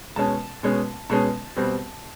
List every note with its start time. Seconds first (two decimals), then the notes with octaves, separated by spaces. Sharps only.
0.16 B2 G#3 C#4 A5
0.63 B2 G#3 C#4
1.10 B2 G#3 C#4 A5
1.56 B2 G3 C4